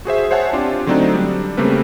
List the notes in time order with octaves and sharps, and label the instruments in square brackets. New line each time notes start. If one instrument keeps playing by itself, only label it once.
[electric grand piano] F#4 G#4 C5 E5
C5 C#5 E5 F#5 G#5 A5
C4 D4 F4 G4
D3 F#3 A3 C4 D4 D#4
G3 D4
C#3 G3 A3 A#3 C4 B4